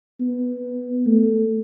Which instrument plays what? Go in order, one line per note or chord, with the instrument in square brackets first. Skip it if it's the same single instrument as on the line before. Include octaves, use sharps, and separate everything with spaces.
[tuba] B3
A3